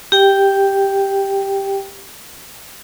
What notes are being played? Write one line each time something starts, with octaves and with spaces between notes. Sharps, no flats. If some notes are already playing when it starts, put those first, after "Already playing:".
G4 G5